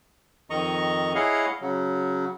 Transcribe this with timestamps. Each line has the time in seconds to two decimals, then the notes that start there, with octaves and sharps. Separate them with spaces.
0.50 F2 D#3 D#5 A#5 C#6
1.15 E4 G#4 C#5 D#5 F5 F#5
1.62 C#3 F#3